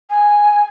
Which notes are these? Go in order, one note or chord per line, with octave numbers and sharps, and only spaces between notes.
G#5